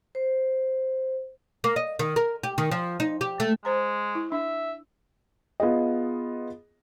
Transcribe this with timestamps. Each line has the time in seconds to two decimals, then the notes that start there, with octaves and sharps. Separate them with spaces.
0.15 C5
1.64 A#3
1.76 D#5
1.99 D#3
2.16 A#4
2.43 G4
2.58 D#3
2.71 F3
3.00 D#4
3.21 G4
3.40 A3
3.65 G#3 C5 A#5
4.15 E4
4.32 D4 E5
5.60 B3 F4 G#4 D#5